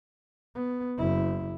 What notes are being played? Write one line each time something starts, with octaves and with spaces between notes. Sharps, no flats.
B3
F#1 E4